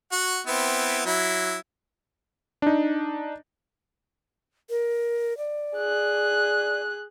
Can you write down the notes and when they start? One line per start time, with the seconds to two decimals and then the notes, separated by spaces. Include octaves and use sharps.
0.12 F#4 F#5
0.47 B3 C4 E4
1.06 F#3 E4
2.62 D4 D#4
4.70 A#4
5.38 D5
5.76 G#4 F#6